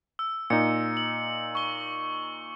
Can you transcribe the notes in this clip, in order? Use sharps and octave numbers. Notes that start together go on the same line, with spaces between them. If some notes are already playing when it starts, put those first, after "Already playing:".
E6
A#2 D#4 C#7
F#7
C#6 G7